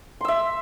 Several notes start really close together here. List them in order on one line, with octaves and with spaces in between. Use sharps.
C6 E6 E5